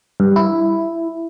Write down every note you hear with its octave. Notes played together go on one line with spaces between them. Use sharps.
G2
E4